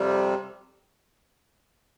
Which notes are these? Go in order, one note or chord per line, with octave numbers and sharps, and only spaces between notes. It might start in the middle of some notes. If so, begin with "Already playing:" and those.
Already playing: F2 C3 G3